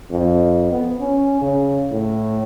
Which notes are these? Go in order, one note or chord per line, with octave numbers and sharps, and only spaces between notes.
F2
B3
C#4
C#3
A2